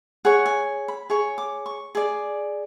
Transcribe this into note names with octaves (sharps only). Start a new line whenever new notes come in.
G#4 C#5 F#5
G#5
B5
G#4 C#5 C#6
D6
C#6
G#4 D5